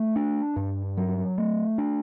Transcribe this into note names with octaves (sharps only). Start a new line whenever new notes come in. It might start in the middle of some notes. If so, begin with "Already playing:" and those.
Already playing: A3
D4
G2
F#3
A3
D4